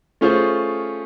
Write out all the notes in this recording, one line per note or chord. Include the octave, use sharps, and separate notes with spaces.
A3 C#4 F4 G#4 C5